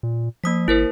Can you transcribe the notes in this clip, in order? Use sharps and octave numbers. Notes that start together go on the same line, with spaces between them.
A#2
F3 A#3 D#6 B6
G#1 E4 A#4 C5